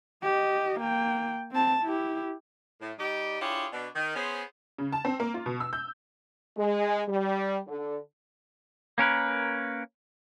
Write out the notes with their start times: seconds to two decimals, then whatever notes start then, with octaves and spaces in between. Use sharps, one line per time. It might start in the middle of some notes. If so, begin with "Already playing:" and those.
0.23 G4 D#5
0.80 A#3 G5
1.52 C4 A5
1.82 E4 G4
2.81 A2
2.99 G3 D#4 G4
3.41 D4 E4 F4 G4 G#4 C#5
3.72 B2 D4
3.96 D#3
4.16 B3 C#4 G#4 C5
4.78 C#3
4.93 A5
5.05 C4
5.20 A#3
5.34 F4
5.46 B2
5.60 E6
5.73 G6
6.57 G#3
7.08 G3
7.67 D3
8.98 A#3 C#4 A#4 B4